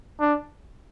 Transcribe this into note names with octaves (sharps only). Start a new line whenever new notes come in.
D4